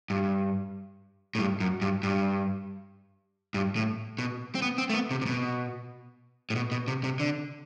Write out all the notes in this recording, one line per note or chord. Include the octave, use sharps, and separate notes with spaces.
G2
A2
G2
F#2
G2
G2
G2
A2
B2
C4
B3
C4
A3
B3
C3
C3
B2
A2
B2
B2
C3
C3
D3